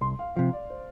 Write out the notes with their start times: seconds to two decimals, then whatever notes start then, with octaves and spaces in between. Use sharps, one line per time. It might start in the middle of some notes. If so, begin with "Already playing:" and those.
0.01 C2 C6
0.19 F5
0.36 C3 F3 F5
0.53 D5
0.70 C5